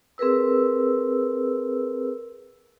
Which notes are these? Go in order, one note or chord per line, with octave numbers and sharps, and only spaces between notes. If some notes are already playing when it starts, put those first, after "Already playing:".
C4 G#4 A#4 B4 E6